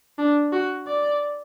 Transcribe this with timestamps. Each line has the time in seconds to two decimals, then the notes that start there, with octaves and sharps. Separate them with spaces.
0.18 D4
0.52 F#4
0.87 D5